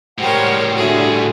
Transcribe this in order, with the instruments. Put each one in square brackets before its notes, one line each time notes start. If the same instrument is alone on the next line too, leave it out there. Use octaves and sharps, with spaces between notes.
[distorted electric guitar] A2 G#3 [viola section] G3 A#4 [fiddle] C5 C#5 [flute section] F#5 G5
[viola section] D3 G3 F#4 [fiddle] G#4 [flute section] E5 F#5